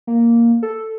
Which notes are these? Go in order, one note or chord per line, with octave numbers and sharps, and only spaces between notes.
A#3
A4